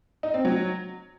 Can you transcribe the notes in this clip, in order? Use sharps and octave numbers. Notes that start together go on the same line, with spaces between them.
D#4
C4
F#3